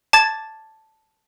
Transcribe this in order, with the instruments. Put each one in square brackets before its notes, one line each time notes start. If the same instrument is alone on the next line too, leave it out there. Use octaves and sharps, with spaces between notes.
[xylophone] A5 D6 G#6 A6